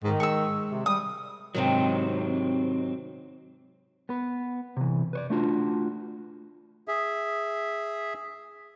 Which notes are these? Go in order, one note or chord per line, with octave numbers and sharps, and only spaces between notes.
G#2 D#3
G#3 C#6 E6
C3
G3 D#6
G#2 C3 D#3 F#3 C4
B3 B4
C3 E3
B4 C#5 D5
A3 D4 F4 F#4
G#4 E5